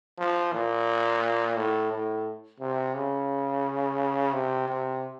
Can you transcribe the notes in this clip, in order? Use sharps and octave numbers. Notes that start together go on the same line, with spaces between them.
F3
A#2
A2
A2
C3
C#3
C3
C3